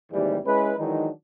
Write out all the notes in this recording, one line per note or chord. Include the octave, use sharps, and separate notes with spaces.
D#2 G#2 C3 E3 G3
G#3 C#4 E4 B4
D#3 E3 F#3 G#3 D4 D#4